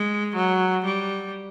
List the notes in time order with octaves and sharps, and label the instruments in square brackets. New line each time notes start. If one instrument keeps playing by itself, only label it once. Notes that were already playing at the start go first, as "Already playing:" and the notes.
Already playing: [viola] G#3
F#3
G3